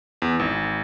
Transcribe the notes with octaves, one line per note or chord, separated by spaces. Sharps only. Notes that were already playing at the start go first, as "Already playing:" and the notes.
E2
G#1